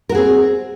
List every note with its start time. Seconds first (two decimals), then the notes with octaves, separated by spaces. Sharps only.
0.09 A#4
0.12 F#4
0.15 G#4
0.17 C4